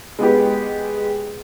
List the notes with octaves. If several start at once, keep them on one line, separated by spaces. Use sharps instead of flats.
G#3 B3 G4